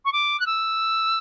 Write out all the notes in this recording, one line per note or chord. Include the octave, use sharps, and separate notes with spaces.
C#6
D6
F#6
E6